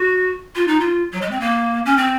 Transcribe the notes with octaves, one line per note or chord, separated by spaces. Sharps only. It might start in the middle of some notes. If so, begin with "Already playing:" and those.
Already playing: F#4
F4
D#4
F4
F#3
G#3
C4
A#3
C#4
C4